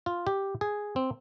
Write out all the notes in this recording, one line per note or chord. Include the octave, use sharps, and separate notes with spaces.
F4
G4
G#4
C4